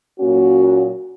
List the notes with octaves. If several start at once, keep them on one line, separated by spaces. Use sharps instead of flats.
A#2 F#3 A#3 C#4 F#4